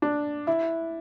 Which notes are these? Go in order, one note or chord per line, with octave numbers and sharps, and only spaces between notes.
D4
E4